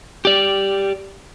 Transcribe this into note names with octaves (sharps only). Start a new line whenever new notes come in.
G4 D5